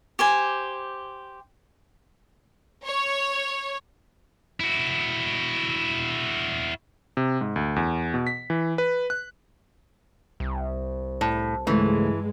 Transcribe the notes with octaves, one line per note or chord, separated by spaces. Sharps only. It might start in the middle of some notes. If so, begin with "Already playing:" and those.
G4 C5 G#5
C#5
E4 F#4
C3
G#2
D2
E2
B2
B6
E3
B4
F#6
C2
A2
C#2 G2 E3 G#3 A3